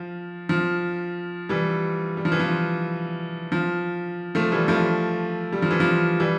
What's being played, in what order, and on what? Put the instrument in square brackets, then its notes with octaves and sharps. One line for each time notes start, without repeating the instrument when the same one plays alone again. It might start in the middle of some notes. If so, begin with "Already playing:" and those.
Already playing: [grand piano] F3
F3
E3 G3
G3
F3
E3
F3
F3
F3 A3
E3 G3
F3 A3
G3
F3
E3
F3
E3 G3